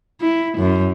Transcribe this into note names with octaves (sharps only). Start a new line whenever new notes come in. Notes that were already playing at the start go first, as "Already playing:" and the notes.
E4
F#2